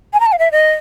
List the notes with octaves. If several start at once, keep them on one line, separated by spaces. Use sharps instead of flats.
G#5
A#5
A5
F5
E5
D#5